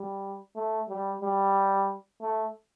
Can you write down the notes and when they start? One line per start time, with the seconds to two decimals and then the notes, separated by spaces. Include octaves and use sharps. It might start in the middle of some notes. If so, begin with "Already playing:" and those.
Already playing: G3
0.56 A3
0.89 G3
1.22 G3
2.21 A3